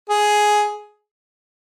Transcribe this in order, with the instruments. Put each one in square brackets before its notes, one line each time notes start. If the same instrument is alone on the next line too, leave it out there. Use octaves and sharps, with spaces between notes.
[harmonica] G#4